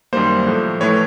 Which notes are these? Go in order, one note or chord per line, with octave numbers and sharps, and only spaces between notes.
F#2 D#3 G3 A#3 C5
A2 F3 A3
A2 E3 A3 C#5